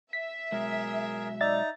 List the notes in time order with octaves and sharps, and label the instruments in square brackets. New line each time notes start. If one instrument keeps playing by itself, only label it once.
[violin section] E5 [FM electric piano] B6
[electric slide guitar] B2 F#3 G#3 [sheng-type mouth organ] G#4 A#4
[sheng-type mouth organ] D#4 A#5 [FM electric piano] D5 E5 A6